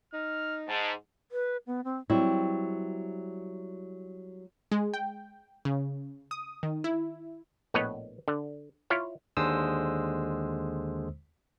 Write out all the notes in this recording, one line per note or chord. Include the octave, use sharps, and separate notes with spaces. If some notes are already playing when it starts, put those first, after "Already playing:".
D#4 F6
G#2 A5
B4
B3
C4
F#3 G3 C4 E4
G#3
G5
C#3
D#6
D#3
E4
A#1 A2 B3 B4 C#5 D#5
D3
E4 F4 C#5 F5
D#2 D3 G#3 C5 D#6 E6